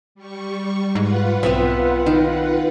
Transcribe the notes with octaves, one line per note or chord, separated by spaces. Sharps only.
G3 C#6
G#2 F4 B4 F#5
B1 B3 C4 E5
D#3